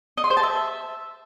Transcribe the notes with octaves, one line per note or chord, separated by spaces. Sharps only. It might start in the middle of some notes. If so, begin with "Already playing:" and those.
D#5
C6
C5
A5
E5